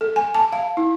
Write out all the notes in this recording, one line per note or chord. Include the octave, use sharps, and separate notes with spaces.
A4
G#5
A5
F5
E4